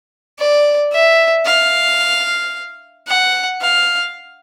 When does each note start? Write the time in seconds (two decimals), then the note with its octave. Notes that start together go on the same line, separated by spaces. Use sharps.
0.39 D5
0.93 E5
1.46 F5
3.08 F#5
3.61 F5